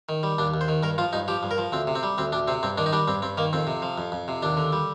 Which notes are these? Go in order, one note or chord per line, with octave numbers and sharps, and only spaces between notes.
D#3
G3
D#2 D4
D#2
C5
D#3
G2 A#4
F3 F4
G2 D#4
F3 G4
G2
A#4
F3
D2 C4
C3
C4
G3
D2 C4
D2 D4
C3 C4
G2 C4
D#3 D4
D#4
G3 D4
G2 C4
G2 C4
D#3 A#3
F2 C4
C3
F3
F2
F2
C3
D#2 D4
D3
G3